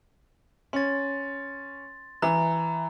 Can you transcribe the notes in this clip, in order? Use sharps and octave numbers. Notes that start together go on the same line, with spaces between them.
C#4 C6 A6
E3 A#5